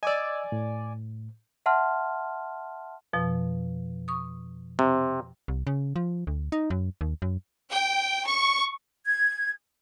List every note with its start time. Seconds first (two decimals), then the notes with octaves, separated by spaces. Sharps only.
0.03 D5 D#5 G#5 D6 E6
0.52 A2
1.66 E5 F#5 A5 C6 F6
3.13 F2 B2 F3
4.08 C#6 D#6
4.79 C3
5.48 C2
5.67 C#3
5.96 F3
6.27 D2
6.52 D#4
6.70 F#2
7.01 D#2
7.22 F#2
7.72 G5
8.27 C#6
9.06 G#6